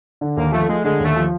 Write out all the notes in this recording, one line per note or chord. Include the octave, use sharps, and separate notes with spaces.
D3
D#2 A#3
F3 A3
G#3 A3
D3 G#3
D#2 A3
F3